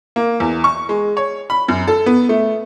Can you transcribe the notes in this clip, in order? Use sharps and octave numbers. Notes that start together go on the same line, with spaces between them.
A#3
E2
C#6
G#3
C#5
B5
F#2
A4
B3
A3